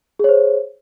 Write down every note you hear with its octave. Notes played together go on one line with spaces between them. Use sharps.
G#4 C5 C#5